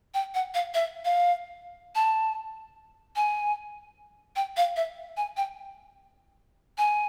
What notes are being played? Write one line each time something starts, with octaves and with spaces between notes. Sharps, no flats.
G5
F#5
F5
E5
F5
A5
G#5
G5
F5
E5
G#5
G5
G#5